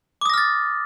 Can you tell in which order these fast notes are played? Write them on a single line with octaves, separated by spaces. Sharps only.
D6 D#6 A#6 F6 A6